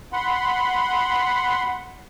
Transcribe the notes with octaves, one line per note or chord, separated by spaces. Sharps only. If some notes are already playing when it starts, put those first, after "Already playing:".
F#5 B5 C6